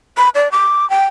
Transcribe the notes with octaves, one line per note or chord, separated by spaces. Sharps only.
B5
D5
D6
G5